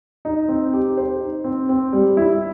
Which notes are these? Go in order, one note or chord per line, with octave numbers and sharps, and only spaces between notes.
D#4
C4
G4
C5
D#4
C4
C4
G3
E4